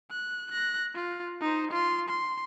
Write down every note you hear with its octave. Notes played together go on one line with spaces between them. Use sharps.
F#6
F#6 A#6
F4
D#4 C5
F4 C6
C6